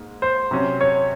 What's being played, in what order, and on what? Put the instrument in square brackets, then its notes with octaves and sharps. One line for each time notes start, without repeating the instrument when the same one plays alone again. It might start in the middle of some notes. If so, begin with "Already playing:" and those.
Already playing: [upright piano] G#2 A#3
[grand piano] C5
[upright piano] C3 F#3 C#4
[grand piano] C#5